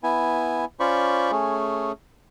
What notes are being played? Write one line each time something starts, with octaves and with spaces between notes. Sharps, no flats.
B3 E4 G#5
C#4 F4 C5 D5 B5 C#6
A3 C#4 G#4